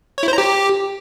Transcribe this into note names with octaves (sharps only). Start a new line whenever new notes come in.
C#5
E4
C5
A#5
G4